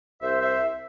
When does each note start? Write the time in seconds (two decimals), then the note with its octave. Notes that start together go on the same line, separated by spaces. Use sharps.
0.22 C2 C5 E5
0.41 C5 E5